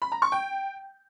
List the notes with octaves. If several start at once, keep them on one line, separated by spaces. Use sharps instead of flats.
B5
A#5
C#6
G5